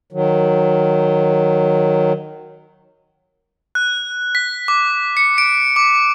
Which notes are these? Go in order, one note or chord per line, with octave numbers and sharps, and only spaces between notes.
D#3 F#3
F#6
B6
D6
C#7
D7
D6